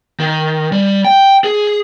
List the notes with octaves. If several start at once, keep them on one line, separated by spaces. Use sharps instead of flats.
D#3
G3
G5
G#4